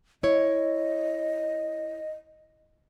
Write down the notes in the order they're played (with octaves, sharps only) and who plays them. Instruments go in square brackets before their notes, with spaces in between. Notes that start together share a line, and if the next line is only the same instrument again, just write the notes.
[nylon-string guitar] E4 C#5 [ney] D#5